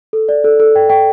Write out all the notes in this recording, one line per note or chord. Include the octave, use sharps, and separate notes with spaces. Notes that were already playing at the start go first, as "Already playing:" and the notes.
A4
D5
A4
A4
G5
G5